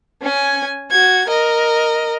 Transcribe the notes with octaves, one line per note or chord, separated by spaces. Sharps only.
C#4 G#5
F#4 G#6
A#4 D#5